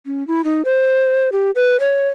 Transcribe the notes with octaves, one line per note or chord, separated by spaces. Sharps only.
C#4
E4
D#4
C5
G4
B4
C#5